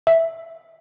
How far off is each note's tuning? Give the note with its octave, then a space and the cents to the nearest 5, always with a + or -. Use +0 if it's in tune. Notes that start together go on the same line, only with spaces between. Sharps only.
E5 +0